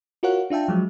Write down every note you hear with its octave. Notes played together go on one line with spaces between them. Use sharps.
F4 F#4 A#4 C#5 F5 F#5
D4 F4 E5 G5 A5
F3 F#3 G#3